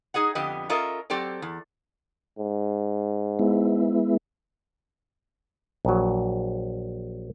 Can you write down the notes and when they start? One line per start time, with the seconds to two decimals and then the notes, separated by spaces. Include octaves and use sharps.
0.14 D#4 G#4 D#5 F#5
0.35 F2 D3 B3 G4 D#5
0.69 C#4 F4 A4 A#4 D#5 E5
1.10 F#3 C4 G4 A4 D5
1.42 E2
2.38 G#2
3.39 G#3 B3 E4
5.85 A#1 F#3